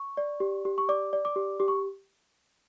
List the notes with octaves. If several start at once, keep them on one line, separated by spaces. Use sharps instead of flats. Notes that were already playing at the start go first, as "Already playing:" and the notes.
Already playing: C#6
D5
G4
G4
C#6
D5 D6
D5
D6
G4
G4 D6
C#6